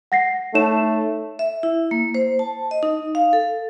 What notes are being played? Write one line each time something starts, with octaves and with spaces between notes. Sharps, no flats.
F#5 A#6 C7
A3 D#4 C#5 E7
E5
E4
A#3
C5
A5
D#5
D#4
F5
A4